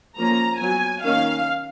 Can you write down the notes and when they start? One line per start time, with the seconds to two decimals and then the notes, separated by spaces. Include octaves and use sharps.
0.17 F3 A#3 C#4 A#5
0.60 F#3 B3 G#5
1.04 D#3 A#3 C#4 F5